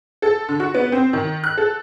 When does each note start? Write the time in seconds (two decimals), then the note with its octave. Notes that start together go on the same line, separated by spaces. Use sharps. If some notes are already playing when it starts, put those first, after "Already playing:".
0.22 A4
0.48 D3
0.60 F#4
0.75 B3
0.92 C4
1.13 D#3
1.44 F#6
1.57 A4